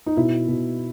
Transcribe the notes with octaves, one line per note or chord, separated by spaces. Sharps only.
D#4
B2 E4
B2